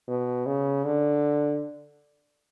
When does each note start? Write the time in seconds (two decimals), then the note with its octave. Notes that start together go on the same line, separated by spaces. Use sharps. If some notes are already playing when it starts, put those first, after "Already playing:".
0.08 B2
0.47 C#3
0.85 D3